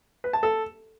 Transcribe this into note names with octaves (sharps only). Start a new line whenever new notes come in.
B4
A5
A4